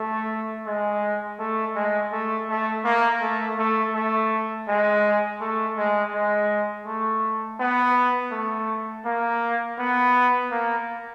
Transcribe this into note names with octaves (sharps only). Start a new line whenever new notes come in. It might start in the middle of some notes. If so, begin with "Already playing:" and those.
Already playing: A3
G#3
A3
G#3
A3
A3
A#3
A3
A3
A3
G#3
A3
G#3
G#3
A3
B3
A3
A#3
B3
A#3